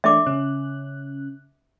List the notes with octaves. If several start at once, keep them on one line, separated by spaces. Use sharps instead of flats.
E3 A3 D4 E5 D6
C#3 C#4 F#6